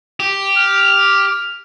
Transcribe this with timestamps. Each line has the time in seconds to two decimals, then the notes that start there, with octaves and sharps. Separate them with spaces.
0.20 G4
0.57 F6